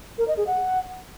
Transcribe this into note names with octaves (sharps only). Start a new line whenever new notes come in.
A#4
D#5
G#4
F#5